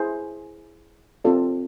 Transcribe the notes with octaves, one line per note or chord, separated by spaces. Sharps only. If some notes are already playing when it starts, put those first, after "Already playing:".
Already playing: E4 G#4 C5
C4 F4 A4 D5